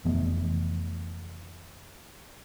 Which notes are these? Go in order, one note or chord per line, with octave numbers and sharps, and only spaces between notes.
F1 E3 A3 B3